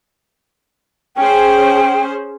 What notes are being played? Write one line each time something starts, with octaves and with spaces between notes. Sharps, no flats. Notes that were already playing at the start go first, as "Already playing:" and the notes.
C#4 G#4 C5 G5